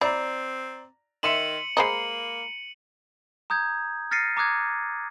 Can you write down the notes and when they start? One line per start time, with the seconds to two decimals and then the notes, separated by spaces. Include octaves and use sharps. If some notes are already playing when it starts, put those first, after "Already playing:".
0.01 C4 E4 D5 A#5
1.23 D#3 E5 C6 C#7 D#7 E7 F#7
1.77 G#3 A#3 C5 D#5 A#5 B5 C7
3.50 A#5 D#6 G6 G#6
4.11 F6 A6 A#6 C7 C#7 D#7
4.37 A#5 D6 D#6 F#6 G#6